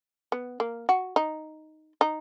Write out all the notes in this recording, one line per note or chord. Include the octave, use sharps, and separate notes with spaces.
B3
A#3
F#4
D#4
D#4